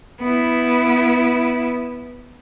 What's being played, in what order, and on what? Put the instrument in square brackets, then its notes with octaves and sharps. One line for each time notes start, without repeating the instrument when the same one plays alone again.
[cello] B3 E4